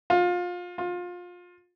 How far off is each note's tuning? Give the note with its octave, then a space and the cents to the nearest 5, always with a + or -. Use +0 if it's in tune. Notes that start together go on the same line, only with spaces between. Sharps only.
F4 +25
F4 +25